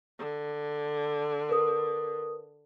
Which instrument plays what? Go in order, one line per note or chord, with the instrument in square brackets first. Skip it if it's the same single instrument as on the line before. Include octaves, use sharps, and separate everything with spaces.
[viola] D3
[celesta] A#4 B4 D#6